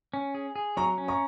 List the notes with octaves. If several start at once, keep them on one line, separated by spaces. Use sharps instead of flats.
C#4
G#4
G#4
F#3 A#5 C#6
C#4
A#5 C#6